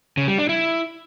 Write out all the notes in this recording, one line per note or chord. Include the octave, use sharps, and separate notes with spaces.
C#3
G3
D4
E4